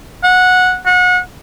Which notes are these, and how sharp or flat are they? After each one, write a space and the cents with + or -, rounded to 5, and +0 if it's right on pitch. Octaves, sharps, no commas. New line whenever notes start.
F#5 -15
F#5 -30